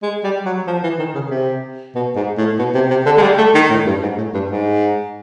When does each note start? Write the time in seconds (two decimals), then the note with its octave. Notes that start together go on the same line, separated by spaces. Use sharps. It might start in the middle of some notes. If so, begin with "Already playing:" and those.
0.03 G#3
0.24 G3
0.45 F#3
0.67 F3
0.83 E3
0.99 D#3
1.15 C#3
1.31 C3
1.95 B2
2.16 G#2
2.38 A2
2.59 B2
2.74 C3
2.90 C3
3.06 D3
3.17 G#3
3.22 G3
3.38 A3
3.55 D#3
3.70 A2
3.86 G2
4.03 G#2
4.18 A2
4.34 G2
4.51 G#2